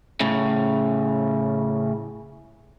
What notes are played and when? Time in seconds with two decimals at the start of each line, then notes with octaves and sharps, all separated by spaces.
0.20 A2 C#3